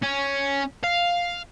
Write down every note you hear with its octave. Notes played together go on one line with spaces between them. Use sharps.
C#4
F5